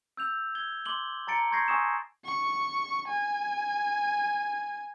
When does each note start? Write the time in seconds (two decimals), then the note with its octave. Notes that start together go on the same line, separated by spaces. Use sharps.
0.17 E6 G6 F7
0.55 G#6 G7
0.85 C6 D6 F#7 G7
1.27 A5 A#5 A6 C#7 D7
1.51 C6 C#6 G6 G#6 A#6 C7
1.68 G#5 C6 C#6 D#6 E6 E7
2.25 C#6
3.08 G#5